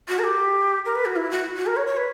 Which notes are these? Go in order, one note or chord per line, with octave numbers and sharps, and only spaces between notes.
F#4
A#4
G4
A#4
B4
F#4
E4
F#4
F#4
A#4
C#5
C#5
B4